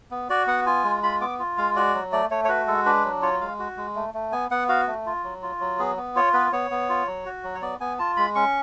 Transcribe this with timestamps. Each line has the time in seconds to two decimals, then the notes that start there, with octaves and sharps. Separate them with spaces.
0.11 B3
0.30 F#4 D5
0.47 B3 F#5
0.66 F4 G#5
0.84 G#3
1.03 F4 B5
1.20 B3 D6
1.39 F4
1.58 G#3 F5
1.76 F#4 D5
1.94 F#3
2.12 A3 D5
2.31 A3 C#5
2.45 C#5
2.49 F#4 B4
2.67 G#3 A4
2.86 D4 B4
3.05 F#3
3.22 F4 C#5
3.40 G#3 F5
3.59 F#4
3.77 G#3
3.96 A3
4.14 A3
4.32 B3 G#5
4.51 B3 F#5
4.69 F#4 F5
4.87 A3
5.06 F4
5.24 F#3
5.42 F4
5.60 F#3
5.79 B3 G#4
5.97 B3
6.16 F4 C#5
6.33 B3 B4
6.52 B3 C#5
6.71 B3
6.89 F4
7.07 F#3
7.25 F#4
7.44 F#3
7.55 C#5
7.62 B3 D5
7.80 B3 G#5
7.99 F4 A5
8.17 G#3 B5
8.35 C#4 C#6